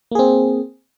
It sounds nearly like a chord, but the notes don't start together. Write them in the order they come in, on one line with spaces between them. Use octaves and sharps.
A#3 G#4 C4